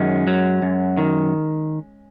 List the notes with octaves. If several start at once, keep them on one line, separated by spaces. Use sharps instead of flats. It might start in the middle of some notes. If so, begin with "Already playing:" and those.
Already playing: F#2 D#3 G#3 C#4
F#3
F#2
D#3